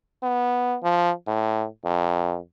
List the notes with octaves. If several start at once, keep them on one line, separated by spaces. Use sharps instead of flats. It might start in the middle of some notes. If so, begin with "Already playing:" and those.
B3
F3
A2
F2